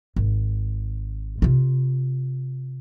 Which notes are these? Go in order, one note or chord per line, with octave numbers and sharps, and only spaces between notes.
G#1
C3 F4